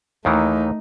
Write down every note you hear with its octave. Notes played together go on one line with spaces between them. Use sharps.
D#2 D#3 E3 A3 D#4